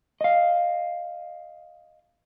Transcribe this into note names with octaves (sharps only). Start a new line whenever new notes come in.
D#5 F5